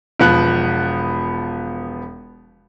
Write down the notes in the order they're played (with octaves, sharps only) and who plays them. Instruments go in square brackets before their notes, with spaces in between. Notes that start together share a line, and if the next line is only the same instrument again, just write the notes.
[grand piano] E1 F3 B3 F#6